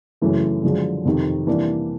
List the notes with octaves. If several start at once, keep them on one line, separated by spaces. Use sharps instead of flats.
F#2 C#3 E3 A3
F#2 D3 F3 G#3
F2 C3 D#3
C3 E3 G3 A#3 D4